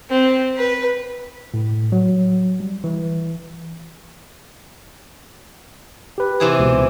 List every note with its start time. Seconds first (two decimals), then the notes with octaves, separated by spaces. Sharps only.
0.10 C4
0.58 B4
1.54 A2
1.92 F#3
2.60 G3
2.84 E3
6.18 G4 B4
6.40 C3 E3 G#4
6.59 C#2 B2